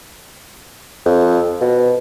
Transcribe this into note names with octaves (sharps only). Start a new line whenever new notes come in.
F2
B2